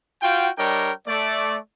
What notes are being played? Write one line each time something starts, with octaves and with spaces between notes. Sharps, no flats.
F4 F#4 F5 G5
G3 D4 A#4 C#5 D#5 G5
A3 D5